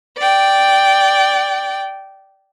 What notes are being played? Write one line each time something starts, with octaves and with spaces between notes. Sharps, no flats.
D5 G5